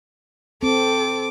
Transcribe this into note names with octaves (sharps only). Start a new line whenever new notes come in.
C4 A4 D6